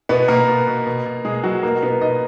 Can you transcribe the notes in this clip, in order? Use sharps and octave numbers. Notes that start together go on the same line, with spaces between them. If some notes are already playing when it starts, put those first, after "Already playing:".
B2 B3 B4
B2 A#3 A#4
B2
B2
B2
B2
B2 G#3 G#4
B2 F#3 F#4
B2 A#3 A#4
B2 B3 B4
B2 D#4 D#5